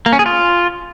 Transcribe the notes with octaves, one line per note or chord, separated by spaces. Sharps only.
A#3
C#4
G#4
F4